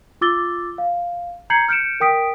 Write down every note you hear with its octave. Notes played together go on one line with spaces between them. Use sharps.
F4 D6 E6 A6 G7
F5
A#5 G6 G#6 C7 C#7 F#7
F6 G6 C#7 D7 E7
A#4 G5 D#6 B6 D7